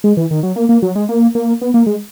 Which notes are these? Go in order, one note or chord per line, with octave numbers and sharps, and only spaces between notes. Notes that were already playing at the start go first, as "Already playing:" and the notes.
G#3
E3
D#3
F#3
A#3
A#3
F#3
G#3
A#3
A#3
B3
A#3
G#3